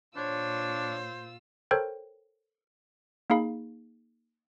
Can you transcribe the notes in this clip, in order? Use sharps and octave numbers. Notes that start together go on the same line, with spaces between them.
A#2 D4 F4 C5 C#5 E6
A4 A#4 C5 C#5 G5
A#3 D#4 G#4 F5 B5